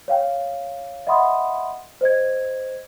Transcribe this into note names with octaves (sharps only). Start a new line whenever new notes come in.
C#5 F5 G5
D#5 E5 F#5 B5 C6 D#6
C5 D#5 G#6